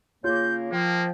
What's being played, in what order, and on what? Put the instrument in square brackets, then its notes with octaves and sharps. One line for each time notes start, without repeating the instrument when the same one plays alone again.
[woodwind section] C#3 A#3 [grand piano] F4 [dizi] G6
[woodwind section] F3 [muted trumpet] A#3 [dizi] G5